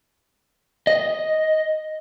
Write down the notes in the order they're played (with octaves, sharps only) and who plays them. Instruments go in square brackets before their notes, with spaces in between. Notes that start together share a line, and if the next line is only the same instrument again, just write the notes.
[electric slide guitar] D#5